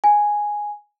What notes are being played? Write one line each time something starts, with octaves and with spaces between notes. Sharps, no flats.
G#5